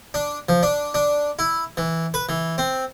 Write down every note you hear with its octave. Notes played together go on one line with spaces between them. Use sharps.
D4
F3
D4
D4
E4
E3
B4
E3
C4